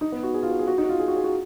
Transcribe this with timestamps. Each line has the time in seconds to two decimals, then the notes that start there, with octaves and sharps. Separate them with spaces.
0.01 D#4
0.12 B3
0.23 F#4
0.34 G#4
0.43 F4
0.50 F#4
0.59 G#4
0.68 F#4
0.78 D#4
0.84 F#4
0.89 F4
1.00 G#4
1.08 F#4
1.16 G#4
1.24 F#4